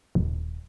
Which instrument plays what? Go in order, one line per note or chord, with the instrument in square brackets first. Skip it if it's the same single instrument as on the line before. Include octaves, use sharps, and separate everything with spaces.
[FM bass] D#1